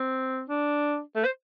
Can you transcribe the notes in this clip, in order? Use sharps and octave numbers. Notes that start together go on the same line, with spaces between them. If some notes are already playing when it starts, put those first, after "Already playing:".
Already playing: C4
D4
A3
C5